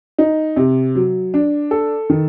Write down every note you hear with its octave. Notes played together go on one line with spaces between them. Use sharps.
D#4
C3
F#3
D4
A4
D#3